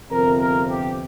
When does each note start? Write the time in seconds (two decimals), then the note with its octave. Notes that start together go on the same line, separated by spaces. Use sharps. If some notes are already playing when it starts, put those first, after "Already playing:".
0.10 G1 F2 C3 F3 A#4
0.40 A#4
0.70 G4